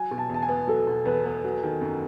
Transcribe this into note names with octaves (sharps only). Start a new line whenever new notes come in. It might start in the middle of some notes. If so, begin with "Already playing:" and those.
Already playing: F#3 G#5
B2
A5
E2 A5
G#5
B3
F#3 A4
B2
E2 B4
B3
F#3
D#3
F#2